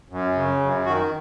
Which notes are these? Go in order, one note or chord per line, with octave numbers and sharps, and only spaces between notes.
F#2
C#3
F#2
D#3 F#4